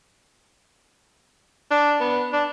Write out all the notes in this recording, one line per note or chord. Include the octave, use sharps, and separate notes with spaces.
D4
B3
D4